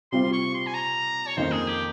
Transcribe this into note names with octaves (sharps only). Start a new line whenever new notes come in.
C3 G3 C4 F4 C6
C#6
C6
G#5
A#5
C#5
F2 D#3 A#3 C#4 C5
G#4
G4